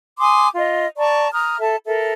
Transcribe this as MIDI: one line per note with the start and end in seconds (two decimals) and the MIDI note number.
0.19 0.48 80
0.19 0.48 84
0.19 0.48 86
0.19 0.48 87
0.55 0.86 65
0.55 0.86 75
0.97 1.28 74
0.97 1.28 81
0.97 1.28 82
0.97 1.28 85
1.32 1.58 82
1.32 1.58 87
1.32 1.58 89
1.59 1.76 69
1.59 1.76 76
1.59 1.76 81
1.86 2.12 69
1.86 2.12 70
1.86 2.12 76